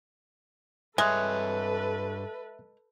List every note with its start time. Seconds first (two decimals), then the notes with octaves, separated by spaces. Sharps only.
0.98 G2 G#3 A4 B4 C#5 E5 F#6